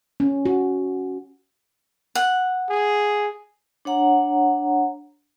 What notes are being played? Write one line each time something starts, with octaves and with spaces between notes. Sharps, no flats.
C#4
F#4
F#5
G#4
D4 C#5 F#5 A#5